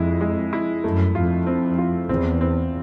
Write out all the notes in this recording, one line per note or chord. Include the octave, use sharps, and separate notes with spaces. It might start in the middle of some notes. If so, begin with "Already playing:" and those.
Already playing: F2 G#3 E4
G#3
E4
F#2 A3
F2 F4
C4
F4
E2 C4
C4